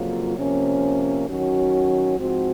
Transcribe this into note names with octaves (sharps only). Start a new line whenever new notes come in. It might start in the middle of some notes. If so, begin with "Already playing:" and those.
Already playing: F2 C#3 F#3 A#3 F4
C3 F3 A#3 C#4
D#3 F#3 C#4 F#4
G#2 F3 C4 F#4